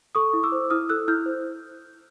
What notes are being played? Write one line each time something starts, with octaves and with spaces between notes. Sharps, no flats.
A4 C#6 D#6
E4
D6 E6
C5
E4 D#6 F6
A4 E6 F#6
E4 F6 G6
C5